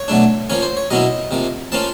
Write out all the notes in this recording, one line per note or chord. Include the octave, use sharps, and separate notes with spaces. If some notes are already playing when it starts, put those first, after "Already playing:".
Already playing: C#5
B2 F#3 A3 D4
F3 A#3 C#4 C#5
C5
C#5
B2 F#3 A#3 C#4 E4 D#5
C3 F3 A#3
F3 A#3 C#4 F4 A5